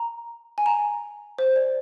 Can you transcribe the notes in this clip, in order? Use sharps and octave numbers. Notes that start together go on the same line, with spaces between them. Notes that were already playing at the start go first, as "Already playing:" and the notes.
Already playing: A#5
G#5
A#5
C5
D5